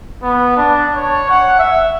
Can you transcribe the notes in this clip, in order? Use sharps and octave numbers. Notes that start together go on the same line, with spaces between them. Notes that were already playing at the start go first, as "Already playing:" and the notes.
B3
D4
C#5
F#5
E5